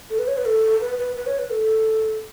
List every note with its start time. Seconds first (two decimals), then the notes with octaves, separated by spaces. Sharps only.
0.10 A4
0.19 B4
0.28 C#5
0.37 B4
0.46 A4
0.81 B4
0.98 B4
1.16 B4
1.26 C#5
1.39 B4
1.50 A4